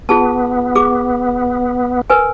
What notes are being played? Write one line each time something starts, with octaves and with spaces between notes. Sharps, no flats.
B3 F4 G#4 A5
G#4 D6
A#4 B4 G#5